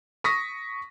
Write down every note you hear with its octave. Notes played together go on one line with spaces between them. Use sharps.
C#6 D#6 A#6 B6